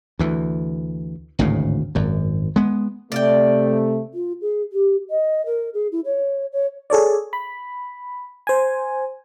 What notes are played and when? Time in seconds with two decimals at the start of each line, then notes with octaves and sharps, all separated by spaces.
0.19 D2 E3
1.39 G#1 D2 A2 C#3
1.95 G#1 F#2
2.56 G#3 B3
3.12 C3 A3 D5 F5 G5
4.13 F4
4.41 G#4
4.72 G4
5.10 D#5
5.46 A#4
5.74 G#4
5.92 E4
6.05 C#5
6.52 C#5
6.90 G#4 A4 C#5 D5
7.33 B5
8.47 C5 G#5